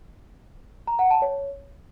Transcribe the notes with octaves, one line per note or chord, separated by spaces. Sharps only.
A#5
F#5
A5
C#5